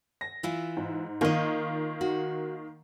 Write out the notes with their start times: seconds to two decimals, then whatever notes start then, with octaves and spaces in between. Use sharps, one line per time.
0.21 A#6
0.43 E3 E4 F4
0.77 G#2
1.21 D#3 A#3 D#4 F4 D#5
2.01 F#4